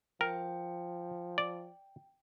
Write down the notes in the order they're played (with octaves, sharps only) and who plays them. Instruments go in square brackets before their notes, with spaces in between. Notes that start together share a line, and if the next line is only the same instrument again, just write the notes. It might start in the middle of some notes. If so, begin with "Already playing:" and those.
[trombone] F3 [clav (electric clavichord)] A#4 [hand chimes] G5
[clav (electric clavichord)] D5